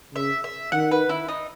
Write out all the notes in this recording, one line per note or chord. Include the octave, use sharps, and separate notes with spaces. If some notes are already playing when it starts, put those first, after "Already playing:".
C#3 E5
E5
D#3 F#5
B4
E4
D#4